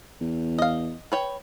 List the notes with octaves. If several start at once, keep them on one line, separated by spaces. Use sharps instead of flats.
E2
D#5 F5
B4 C#5 G5